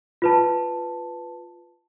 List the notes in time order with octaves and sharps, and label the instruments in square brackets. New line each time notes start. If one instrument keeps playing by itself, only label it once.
[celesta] F4 B4 A5